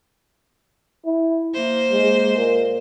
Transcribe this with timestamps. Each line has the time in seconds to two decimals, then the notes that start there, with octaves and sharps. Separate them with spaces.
1.06 E4
1.54 A#3 C5
1.92 G#3
2.37 A#2